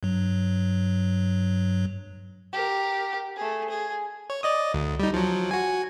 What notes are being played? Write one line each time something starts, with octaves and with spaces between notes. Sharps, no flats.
G2 F#3
G4 A#4
A3 G#4
G#4
C#5
D5 D#5 D#6
D2
G3 D#4
F3 F#3
F#4 G#5